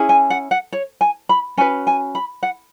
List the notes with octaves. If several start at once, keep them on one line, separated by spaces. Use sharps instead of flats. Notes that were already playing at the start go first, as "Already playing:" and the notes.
Already playing: C#4 E4 G#4
G#5
F#5
F#5
C#5
G#5
B5
C#4 F#4 B4 G#5
G#5
B5
F#5